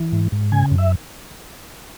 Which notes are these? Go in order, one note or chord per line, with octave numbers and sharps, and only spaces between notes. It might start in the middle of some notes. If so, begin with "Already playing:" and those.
Already playing: E3
G#2
G#2
C#3 G#5
F#2
E5